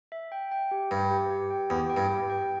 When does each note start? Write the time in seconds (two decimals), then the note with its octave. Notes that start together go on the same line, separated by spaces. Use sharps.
0.12 E5
0.32 G5
0.52 G5
0.71 G4
0.91 G2 G5
1.11 G4
1.30 G4
1.50 G5
1.70 E2 G4
1.90 G5
1.97 G2
2.10 G4
2.30 G5